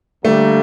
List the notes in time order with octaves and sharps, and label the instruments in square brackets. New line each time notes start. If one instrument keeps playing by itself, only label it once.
[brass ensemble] D3 G3 A#3 [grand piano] A3